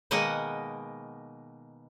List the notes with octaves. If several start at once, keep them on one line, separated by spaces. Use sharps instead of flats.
B2 D#3 G#3 A#3 D#5 F#5